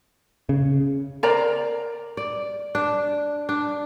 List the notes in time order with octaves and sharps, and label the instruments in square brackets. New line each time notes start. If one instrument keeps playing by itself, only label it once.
[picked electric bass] C#3
[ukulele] A#4 C5 D5 A#5
[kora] D5
D4
D4